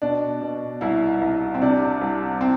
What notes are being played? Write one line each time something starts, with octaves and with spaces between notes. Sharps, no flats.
B2 D4
B2
C2 E4
C2
C4
C3 D4
C2
C4